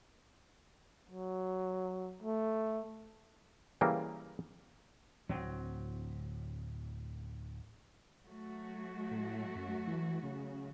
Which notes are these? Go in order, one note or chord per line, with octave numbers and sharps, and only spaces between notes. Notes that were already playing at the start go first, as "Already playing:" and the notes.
F#3
A3
C#3 E3 G3 A#3
D1 F#3 C4
F#3 A3 F#4
A2
F#2
E3
C#3